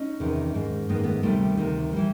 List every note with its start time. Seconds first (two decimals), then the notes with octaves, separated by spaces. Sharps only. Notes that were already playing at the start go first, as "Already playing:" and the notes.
Already playing: C#4 D#4
0.20 E2 C3 D#3
0.54 G#2 D#3
0.89 G#2 D#3 B3
0.96 A#3
1.04 A3 B3
1.23 D2 C3 D#3 G3 A3
1.57 D2 C3 D#3
1.93 E3 G3